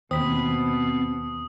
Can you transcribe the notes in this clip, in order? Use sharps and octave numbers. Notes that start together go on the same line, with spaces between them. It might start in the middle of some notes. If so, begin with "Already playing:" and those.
D#2 B2 C4 B5 D#6